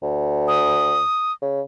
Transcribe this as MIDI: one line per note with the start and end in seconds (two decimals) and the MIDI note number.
0.03 1.03 38
0.48 1.32 87
1.42 1.61 49